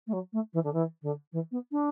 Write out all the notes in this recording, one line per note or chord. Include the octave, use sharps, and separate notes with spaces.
A3
F#3
A3
E3
D3
E3
D3
E3
B3
D4